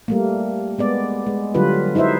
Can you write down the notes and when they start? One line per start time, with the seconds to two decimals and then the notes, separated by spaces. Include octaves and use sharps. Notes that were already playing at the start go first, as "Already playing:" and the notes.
0.08 G3 A3 A#3
0.79 G#3 B3 D5
1.27 G#3
1.55 D3 F#3 G3 F4 B4
1.95 D#4 E4 B4 C5 E5